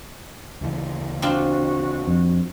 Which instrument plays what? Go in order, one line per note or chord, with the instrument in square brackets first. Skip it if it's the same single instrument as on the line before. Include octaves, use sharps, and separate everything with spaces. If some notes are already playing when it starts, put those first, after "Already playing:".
[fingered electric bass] D2 C#3 E3
[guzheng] C4 D4 F4 [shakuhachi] F#4
[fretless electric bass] F2